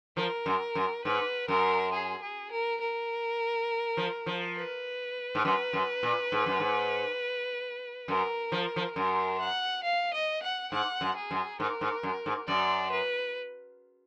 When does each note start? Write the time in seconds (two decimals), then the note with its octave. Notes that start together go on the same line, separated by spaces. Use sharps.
0.16 F3 A#4
0.46 F#2
0.75 F#2
1.04 G#2 B4
1.48 F#2 A#4
1.92 G#4
2.22 G#4
2.51 A#4
2.81 A#4
3.97 F3
4.26 F3
4.56 B4
5.35 G#2
5.45 F#2 B4
5.73 F#2
6.03 A#2
6.32 G#2
6.46 F#2
6.60 G#2
8.08 F#2 A#4
8.52 F3
8.76 F3
8.96 F#2 A#4
9.40 F#5
9.83 F5
10.13 D#5
10.42 F#5
10.72 G#2 F#5
11.01 F#2
11.16 G#4
11.31 F#2
11.60 G#2 A#4
11.81 G#2
12.03 F#2
12.26 G#2
12.47 F#2 D5
12.92 B4